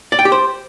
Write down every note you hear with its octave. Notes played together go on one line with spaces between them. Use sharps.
D5
G5
G4
C5